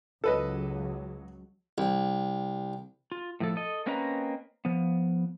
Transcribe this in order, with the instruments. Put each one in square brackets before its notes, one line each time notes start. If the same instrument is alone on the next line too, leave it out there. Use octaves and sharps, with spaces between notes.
[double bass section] C#2 F#3 [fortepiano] A4 B4 D#5
[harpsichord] C2
[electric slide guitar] F4
A2 F3 A4
A4 D#5
A#3 C4 C#4 B4 D#5 A#5
F3 B3